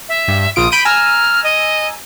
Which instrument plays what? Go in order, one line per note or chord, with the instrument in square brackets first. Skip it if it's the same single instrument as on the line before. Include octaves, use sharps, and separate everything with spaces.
[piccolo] E5
[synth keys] G2
[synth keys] A#1 F4 D7 [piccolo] D#6
[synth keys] B5 G6 D#7 [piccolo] D7
[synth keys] G#5 A#5 E6 [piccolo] F6
[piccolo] D#5